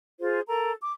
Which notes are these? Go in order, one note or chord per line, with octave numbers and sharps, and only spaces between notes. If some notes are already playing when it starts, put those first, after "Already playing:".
F4 G#4 C5
A4 A#4 A#5
D6